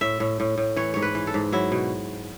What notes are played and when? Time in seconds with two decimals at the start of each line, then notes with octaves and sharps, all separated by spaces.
0.01 A2 E5
0.20 A2
0.40 A2
0.58 A2
0.76 E3 C#5
0.94 G#2 C#5
1.02 B4
1.15 E3
1.27 A4
1.34 G#2
1.52 F#3 E4
1.72 B2